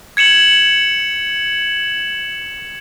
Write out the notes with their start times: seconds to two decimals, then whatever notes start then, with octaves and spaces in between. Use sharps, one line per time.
0.17 G#6 C#7 E7 F#7